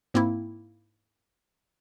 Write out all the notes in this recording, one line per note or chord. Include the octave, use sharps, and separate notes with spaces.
G#2 A#3 C4 E4